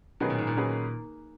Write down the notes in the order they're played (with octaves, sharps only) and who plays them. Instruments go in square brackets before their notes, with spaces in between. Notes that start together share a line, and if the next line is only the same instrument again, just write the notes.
[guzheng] B2 [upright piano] D#3 F#3 C#4 G#4 B4
[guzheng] A#2
G#2
A#2
[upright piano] D#3 F#3 C#4 G#4 B4